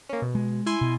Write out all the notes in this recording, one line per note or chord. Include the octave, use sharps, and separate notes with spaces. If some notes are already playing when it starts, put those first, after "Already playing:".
A#3 C#4
B2
G#3
E4 G#5 C6
B2